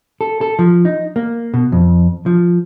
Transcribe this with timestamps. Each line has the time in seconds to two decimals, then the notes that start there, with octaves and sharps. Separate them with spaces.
0.21 A4
0.41 A4
0.59 F3
0.85 D#4
1.16 A#3
1.54 B2
1.72 F2
2.26 F3